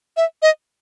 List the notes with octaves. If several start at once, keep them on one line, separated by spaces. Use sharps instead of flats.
E5
D#5